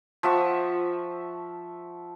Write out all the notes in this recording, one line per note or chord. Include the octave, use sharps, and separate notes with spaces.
F3 E5 F#5 C#6